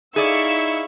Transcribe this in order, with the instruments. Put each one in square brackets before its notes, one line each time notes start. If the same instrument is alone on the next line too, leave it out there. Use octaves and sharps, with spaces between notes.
[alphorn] D#4 [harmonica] E4 [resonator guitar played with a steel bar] G#4 D5 [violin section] F5 C#6 E6